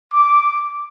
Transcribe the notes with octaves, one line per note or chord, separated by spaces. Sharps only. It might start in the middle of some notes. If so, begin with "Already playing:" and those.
D6